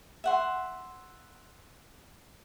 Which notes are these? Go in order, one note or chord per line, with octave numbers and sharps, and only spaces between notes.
E5 F#5 C6